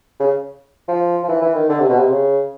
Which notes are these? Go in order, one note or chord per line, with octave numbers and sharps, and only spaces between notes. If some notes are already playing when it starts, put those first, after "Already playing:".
C#3
F3
F3
E3
E3
D#3
D3
C3
B2
C3
C#3